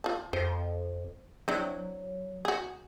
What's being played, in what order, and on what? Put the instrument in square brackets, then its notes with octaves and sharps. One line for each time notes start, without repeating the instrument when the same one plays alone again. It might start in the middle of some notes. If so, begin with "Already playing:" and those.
[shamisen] F4 A5
[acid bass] F2 [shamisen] C5
[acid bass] F#3 [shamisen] C4 D4 E4
[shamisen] F#4 G#4